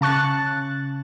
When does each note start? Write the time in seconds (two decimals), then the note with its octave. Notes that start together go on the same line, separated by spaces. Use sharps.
0.01 C#3 A5 C#6 F#6 A6